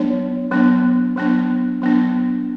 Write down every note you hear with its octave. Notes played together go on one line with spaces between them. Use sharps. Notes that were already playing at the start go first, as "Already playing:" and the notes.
Already playing: F#3 B3 D4 C#5
F#3 B3 D4
F#3 B3 D4
F#3 B3 D4